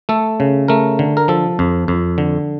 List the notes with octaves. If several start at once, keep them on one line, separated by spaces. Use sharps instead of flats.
A3 A4
C#3
A3 A#4
D3
A#4
F3 A4
F2
F2
D3